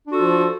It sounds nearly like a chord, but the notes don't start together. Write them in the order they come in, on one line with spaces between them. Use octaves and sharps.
D4 F#4 A4 F4 F3